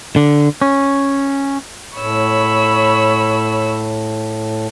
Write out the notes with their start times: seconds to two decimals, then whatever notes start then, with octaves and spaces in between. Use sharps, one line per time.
0.16 D3
0.62 C#4
1.97 A2 C#5 B5 E6